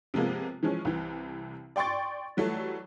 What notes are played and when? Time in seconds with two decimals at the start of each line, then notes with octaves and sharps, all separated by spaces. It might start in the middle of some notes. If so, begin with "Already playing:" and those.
0.14 C3 F3 G#3 A#3 B3
0.63 E3 F3 G#3 C#4
0.85 C2 C3 E3
1.76 D5 G5 C6 C#6 A6
2.37 E3 F#3 G3 A3